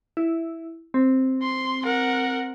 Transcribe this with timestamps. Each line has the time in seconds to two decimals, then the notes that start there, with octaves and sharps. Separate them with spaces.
0.17 E4
0.94 C4
1.42 C6
1.84 A#4 F#5